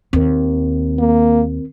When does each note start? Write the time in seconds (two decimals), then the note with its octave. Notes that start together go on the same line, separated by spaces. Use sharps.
0.13 D#2 C4 A#4
0.99 A#3